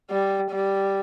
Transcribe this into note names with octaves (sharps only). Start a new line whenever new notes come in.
G3
G3